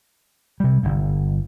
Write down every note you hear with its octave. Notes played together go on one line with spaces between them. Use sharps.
C3 G3
G1 G2